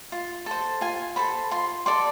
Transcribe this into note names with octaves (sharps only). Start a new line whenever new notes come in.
F4
A4 C5
F4 G#5
A4 C5 B5
F4 C6
A4 D5 C6